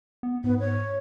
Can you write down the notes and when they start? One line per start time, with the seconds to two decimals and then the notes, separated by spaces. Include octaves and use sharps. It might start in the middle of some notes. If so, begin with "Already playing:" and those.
0.23 B3
0.44 G#2 B3
0.60 C#5